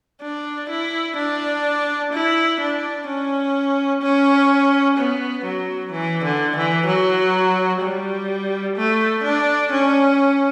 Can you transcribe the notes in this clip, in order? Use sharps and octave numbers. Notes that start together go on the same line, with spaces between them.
D4
E4
D4
E4
D4
C#4
C#4
B3
F#3
E3
D3
E3
F#3
G3
A3
D4
C#4